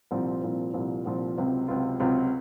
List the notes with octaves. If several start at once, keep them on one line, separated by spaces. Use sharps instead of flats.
C2 A#2 F3 C4
C2 A#2 F3 C4
C2 A#2 F3 C4
C2 A#2 F3 C4
C#2 C3 F#3 C4 F4
C#2 C3 F#3 C4 F4
C#2 C3 F#3 C4 F4